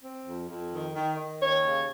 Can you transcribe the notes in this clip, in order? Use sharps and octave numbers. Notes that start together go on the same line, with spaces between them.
C4
F2
F2
D#3
D#3
D#3
D#2 C#5
C#3